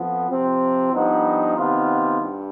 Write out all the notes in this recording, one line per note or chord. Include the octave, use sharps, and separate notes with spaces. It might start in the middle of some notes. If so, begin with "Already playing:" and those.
Already playing: F2 F3 B3
C3 F3 C4
G2 F3 B3 D#4
C3 D#3 B3 F4
G2